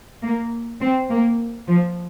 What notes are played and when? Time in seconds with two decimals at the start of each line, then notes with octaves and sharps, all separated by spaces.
0.23 A#3
0.81 C4
1.10 A#3
1.68 F3